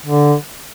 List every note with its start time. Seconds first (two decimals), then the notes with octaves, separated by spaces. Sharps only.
0.06 D3